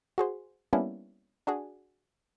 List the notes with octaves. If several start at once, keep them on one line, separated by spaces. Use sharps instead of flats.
F#4 G#4 C5
G3 A#3 B3 C#4 D4 E4
D4 F#4 G#4